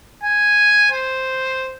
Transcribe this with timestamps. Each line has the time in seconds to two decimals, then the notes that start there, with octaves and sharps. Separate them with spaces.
0.23 G#5
0.92 C5